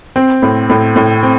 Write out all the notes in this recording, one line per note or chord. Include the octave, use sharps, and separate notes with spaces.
C4
A2
A2
A2
C4